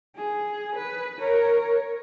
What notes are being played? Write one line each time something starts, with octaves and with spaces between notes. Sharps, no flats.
G#4
B4
A#4 C#5